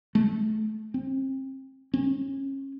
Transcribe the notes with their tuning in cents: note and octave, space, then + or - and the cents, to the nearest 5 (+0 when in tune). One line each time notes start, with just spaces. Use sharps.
A3 -25
C4 +30
C#4 -30